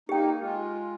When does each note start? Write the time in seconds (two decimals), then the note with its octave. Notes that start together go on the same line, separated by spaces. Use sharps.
0.09 A#3 D#4 G4 G5
0.40 G#3 F4